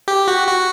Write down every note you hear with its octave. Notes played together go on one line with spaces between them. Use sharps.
G4
F#4
F#4